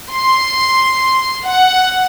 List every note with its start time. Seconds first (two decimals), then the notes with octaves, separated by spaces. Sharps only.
0.11 C6
1.45 F#5